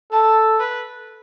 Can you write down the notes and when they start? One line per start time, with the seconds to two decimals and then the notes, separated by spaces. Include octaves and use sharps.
0.12 A4 A5
0.60 B4